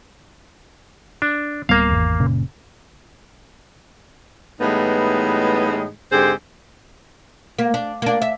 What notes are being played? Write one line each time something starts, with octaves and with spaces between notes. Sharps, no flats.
D4
D1 G3 A#3 B3 F5
G#1 E2
F#1 A#2 C#3
A2 E3 G3 G#3 B3 D#4
G#2 D3 C4 G4 G#4 C5
A#3
D4
A#3 D4
E5